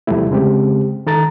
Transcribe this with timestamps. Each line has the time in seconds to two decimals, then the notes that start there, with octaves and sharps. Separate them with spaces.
0.07 E2 C3 F3 G3 A3 E4
0.30 C#3 G#3 C4 G4
1.07 D#3 A4 A#5 A6